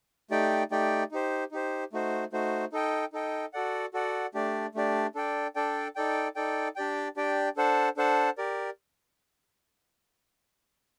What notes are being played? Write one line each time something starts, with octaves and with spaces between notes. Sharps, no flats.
A3 D#4 G4 D5 G5
A3 D#4 G4 D5 G5
D#4 G4 C5
D#4 G4 C5
A3 D#4 F#4 C5
A3 D#4 F#4 C5
D#4 A4 D#5 G5
D#4 A4 D#5 G5
F#4 A4 D5 F#5
F#4 A4 D5 F#5
A3 D4 G4 D5
A3 D4 G4 D5
D4 A4 D5 G5
D4 A4 D5 G5
D#4 A4 D5 G5
D#4 A4 D5 G5
D4 G4 D5 G5
D4 G4 D5 G5
D4 A4 C5 F#5 A5
D4 A4 C5 F#5 A5
G4 A#4 D5